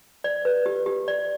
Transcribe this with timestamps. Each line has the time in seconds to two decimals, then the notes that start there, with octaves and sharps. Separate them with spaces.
0.24 D5
0.45 B4
0.66 G4
0.86 G4
1.08 D5